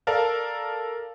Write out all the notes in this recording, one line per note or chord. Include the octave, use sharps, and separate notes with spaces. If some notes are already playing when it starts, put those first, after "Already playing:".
A4 A#4 D5 F5 A5